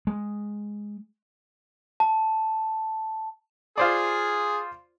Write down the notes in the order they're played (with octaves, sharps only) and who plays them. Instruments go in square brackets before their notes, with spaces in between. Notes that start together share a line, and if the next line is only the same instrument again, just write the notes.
[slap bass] G#3
[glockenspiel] A5
[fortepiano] F4 C5 D5 [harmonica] G#4